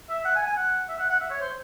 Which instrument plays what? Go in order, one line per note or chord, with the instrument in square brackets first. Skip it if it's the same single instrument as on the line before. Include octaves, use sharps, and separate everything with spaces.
[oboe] E5
F#5
G#5
G#5
F#5
E5
F#5
F#5
E5
C#5
C5